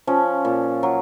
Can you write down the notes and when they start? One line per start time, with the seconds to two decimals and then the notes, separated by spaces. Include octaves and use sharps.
0.07 F3 C#4
0.45 A#2
0.83 F#3